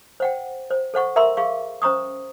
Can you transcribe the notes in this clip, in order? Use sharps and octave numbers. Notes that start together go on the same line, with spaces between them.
C5 F#5 G5
C5
A4 C5 F#5 C#6
A#4 E5 A#5 C6 C#6 E6
G#4 F5 C#6
C#4 C5 A#5 C#6 D#6